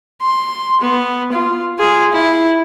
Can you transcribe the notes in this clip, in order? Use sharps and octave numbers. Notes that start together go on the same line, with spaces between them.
C6
B3
F4
F4 G#4
E4